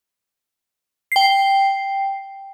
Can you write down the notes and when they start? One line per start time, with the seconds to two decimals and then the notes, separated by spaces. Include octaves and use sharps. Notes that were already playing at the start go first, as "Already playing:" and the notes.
1.12 G5 C7